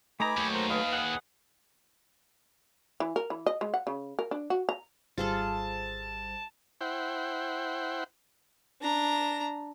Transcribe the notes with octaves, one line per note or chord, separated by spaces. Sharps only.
A3 D#4 B4 G#5 A#5 B5 D6
D#2 F#3 A3 C#5
A#4 C5
B4 D#5 F5 G#5
G#4 F#5
E3
A#4
E3
D#5
G#3
F#5
C#3
A#4
D4
F#4
A#5
G#1 G3 F4 G#4 A4 C5 A5
E4 C5 F#5 G5
D4 A#5